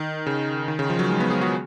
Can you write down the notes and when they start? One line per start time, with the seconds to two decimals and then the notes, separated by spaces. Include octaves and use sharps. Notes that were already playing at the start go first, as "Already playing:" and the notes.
Already playing: D#3
0.26 C#3
0.68 D#3
0.79 C#3
0.90 F3
0.99 F#3
1.10 G#3
1.20 B3
1.30 G#4
1.41 F#4